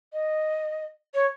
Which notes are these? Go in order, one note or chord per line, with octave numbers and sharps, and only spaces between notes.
D#5
C#5